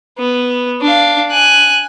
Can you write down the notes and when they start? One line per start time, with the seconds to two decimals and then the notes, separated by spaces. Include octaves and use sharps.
0.19 B3
0.81 D4 F5
1.31 G#5 F#6